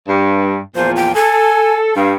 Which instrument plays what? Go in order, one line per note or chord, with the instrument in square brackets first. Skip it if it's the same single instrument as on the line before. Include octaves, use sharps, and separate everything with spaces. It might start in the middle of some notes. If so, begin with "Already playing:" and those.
[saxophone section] G2
[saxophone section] E2 A#2 F3 [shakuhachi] C5
[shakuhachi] G5
[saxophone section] A4 [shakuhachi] G#5
[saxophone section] G2 [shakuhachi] F5